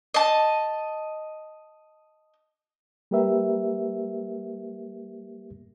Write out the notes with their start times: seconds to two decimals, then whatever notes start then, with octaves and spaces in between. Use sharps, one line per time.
0.14 D#5 A5
3.11 G3 A#3 G4 A#4 B4 E5